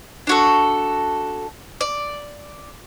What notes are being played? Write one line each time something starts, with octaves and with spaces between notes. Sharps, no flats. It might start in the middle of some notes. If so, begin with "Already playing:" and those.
D4 F#4 A4
D5